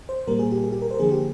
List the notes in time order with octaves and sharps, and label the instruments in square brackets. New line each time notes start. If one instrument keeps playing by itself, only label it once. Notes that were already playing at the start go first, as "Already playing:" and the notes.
[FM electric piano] C5
A#2 G3 A#3 A#4
G#4
G4
G#4
G4
A#4
C5
A#4
D3 F3 A#3 G#4
G4